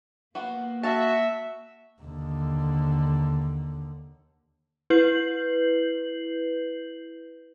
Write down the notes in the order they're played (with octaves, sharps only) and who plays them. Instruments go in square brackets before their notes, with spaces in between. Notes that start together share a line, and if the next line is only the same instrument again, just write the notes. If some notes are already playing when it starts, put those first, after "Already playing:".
[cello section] A#3 [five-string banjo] B3 F4 F#4
[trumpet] F#4 [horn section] E5 [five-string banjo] F5 A5
[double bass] D#2 D3
[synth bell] E4 B4 G6 C7 F#7